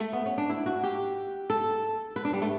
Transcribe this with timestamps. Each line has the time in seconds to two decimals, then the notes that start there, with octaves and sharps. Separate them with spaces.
0.00 A3
0.13 B3
0.26 C#4
0.38 D4
0.50 E4
0.66 F#4
0.83 G4
1.50 A4
2.16 B4
2.25 D4
2.33 G3
2.42 A3